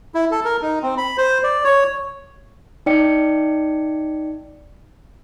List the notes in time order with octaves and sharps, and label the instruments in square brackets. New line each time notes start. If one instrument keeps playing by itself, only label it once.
[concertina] E4
A4
A#4
D#4
C4
B5
C5
D5
C#5
[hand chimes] D#4 D5 G5 C#7